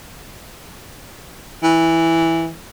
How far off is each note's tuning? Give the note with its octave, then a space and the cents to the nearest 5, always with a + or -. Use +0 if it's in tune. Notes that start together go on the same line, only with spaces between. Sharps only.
E3 -5